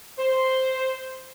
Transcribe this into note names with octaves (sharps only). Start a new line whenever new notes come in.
C5